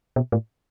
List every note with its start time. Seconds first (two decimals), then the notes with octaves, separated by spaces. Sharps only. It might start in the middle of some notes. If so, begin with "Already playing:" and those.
0.16 B2
0.32 A2